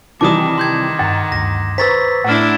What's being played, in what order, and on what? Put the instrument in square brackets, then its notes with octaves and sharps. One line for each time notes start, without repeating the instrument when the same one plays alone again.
[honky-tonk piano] C3 E3 G3 [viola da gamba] D#3 [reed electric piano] A5 [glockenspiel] D6 D#6
[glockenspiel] C6 G6 G#6
[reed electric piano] G2 A6 [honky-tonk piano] F#5 A#5
[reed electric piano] D2 G2 [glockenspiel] A#6
[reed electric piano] B4 C5 [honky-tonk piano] A#5 C#6 [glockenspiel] E6 A6 B6
[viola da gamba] A2 D4 E4 [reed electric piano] F#5 F6